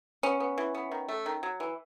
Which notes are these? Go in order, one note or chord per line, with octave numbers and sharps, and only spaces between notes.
B3 C#4
B3
E3
B3
D#3
A3
D#3
F#3
E3